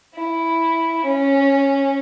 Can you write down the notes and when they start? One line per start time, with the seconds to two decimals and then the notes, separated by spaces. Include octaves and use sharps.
0.15 E4
1.04 C#4